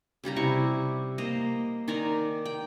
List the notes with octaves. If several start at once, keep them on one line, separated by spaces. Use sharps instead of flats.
C#3 G3 G4 A#5
C3 E4 C#6
A#3 C5 D#5 A#5
D#3 D5 G#5 A#5
G5